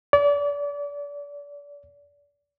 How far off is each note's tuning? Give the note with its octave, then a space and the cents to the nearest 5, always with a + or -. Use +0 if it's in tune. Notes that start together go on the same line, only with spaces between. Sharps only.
D5 -30